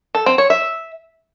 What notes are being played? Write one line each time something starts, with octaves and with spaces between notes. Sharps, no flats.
A4
C4
C#5
E5